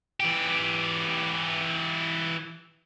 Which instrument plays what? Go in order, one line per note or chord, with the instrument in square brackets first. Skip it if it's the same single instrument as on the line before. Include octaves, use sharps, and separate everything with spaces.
[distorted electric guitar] E3 G4